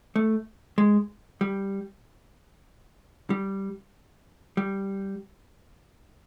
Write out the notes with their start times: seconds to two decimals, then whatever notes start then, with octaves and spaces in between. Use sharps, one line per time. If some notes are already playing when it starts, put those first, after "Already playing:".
0.16 A3
0.78 G#3
1.41 G3
3.30 G3
4.57 G3